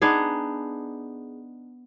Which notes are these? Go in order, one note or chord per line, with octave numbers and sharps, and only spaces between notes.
B3 D4 D#4 G#4